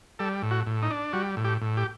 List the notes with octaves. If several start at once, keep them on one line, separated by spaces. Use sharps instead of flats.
G3 A4
A2
F#4
A2
D#4
D4
G3 F#4
A2
G4
A2
G4